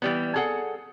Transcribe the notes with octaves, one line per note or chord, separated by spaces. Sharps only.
E3 G3 B3
G#4 A4 F#5